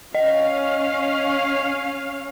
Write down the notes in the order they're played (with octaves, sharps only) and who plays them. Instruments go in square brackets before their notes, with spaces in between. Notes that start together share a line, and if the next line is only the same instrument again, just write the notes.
[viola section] C#4 F5 [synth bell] D#5